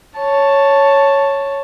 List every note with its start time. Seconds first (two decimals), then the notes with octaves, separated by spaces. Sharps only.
0.19 C#5 A5